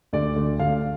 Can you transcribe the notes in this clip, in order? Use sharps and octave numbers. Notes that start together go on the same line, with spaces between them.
D2 D5
D2
D2 F5